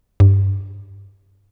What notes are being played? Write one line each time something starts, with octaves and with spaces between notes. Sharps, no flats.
G2